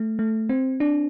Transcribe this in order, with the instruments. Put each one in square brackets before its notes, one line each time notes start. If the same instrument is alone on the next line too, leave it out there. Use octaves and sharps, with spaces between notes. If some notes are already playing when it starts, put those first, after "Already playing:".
Already playing: [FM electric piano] A3
A3
C4
D4